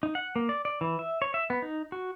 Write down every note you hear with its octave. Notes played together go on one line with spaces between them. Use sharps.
D#4
F#5
A#3
D5
D5
E3
E5
C#5
E5
B3
D#4
F#4